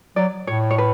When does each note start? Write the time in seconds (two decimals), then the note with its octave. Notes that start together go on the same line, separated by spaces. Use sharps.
0.16 F#3 D5
0.47 A2 C#5
0.71 C#5
0.78 B4